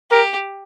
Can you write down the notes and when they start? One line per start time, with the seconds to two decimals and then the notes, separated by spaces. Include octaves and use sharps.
0.11 G4 A#4